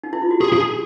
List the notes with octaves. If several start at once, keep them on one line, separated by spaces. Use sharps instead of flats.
D#4
E4
F4
F#4
G4 G#4
G#4